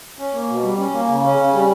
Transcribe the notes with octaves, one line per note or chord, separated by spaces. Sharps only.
C#4
A#3
B2
G3
C#4
A#3
C#3
C#4
C#3
G3